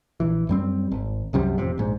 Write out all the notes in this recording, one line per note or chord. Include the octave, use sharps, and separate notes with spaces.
A#1 E3
F#2 G3 C4
G#1
C2 F#2 C3 G3
A1 F2 C3
A#1 G#2